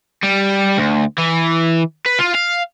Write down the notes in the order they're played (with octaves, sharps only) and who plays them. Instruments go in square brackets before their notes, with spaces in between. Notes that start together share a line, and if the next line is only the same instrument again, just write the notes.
[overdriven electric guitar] G3
D2
E3
B4
F4
F5